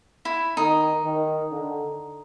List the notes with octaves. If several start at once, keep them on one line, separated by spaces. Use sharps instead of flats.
E4
D#3 D#4
D#3
D3